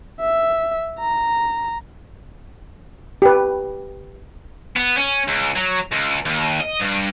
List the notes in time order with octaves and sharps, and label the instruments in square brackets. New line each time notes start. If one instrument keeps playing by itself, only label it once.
[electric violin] E5
A#5
[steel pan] G4 B4
[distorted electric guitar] B3
C#4
C#2
F#3
C#2
D#2
D#5
G2